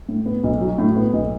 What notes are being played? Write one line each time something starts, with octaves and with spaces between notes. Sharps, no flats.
A2
B3
B1
F#3
A2
B3
B1